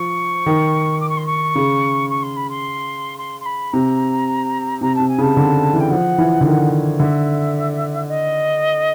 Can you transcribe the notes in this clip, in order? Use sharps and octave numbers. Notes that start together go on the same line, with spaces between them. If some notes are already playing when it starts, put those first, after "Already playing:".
Already playing: F3 C#6
D#3
D6
C#6
C6
C#6
C#3
C#6
C6
B5
C6
C6
C6
B5
C3 A#5
C3 A#5
C3 A5
G#5
C#3 A5
D3
E3
G5
F3 F#5
E3
D3
D#3
D3 E5
D#5